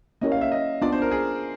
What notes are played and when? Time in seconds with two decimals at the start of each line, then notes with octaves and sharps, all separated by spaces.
0.21 A#3 C#4 E4 G4 A#4 D#5
0.32 F5
0.41 E5
0.52 D#5
0.82 B3 D4 F4 D5
0.92 C5
1.02 A#4
1.11 G#4